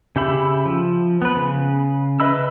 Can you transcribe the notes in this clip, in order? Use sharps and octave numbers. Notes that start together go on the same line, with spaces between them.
C#3 G4 E5 B5
F3
B3 B4
C#3
B4 D#5 E5 B5 E6